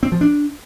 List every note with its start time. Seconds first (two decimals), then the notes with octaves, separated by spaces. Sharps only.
0.03 C4
0.12 F3
0.21 D4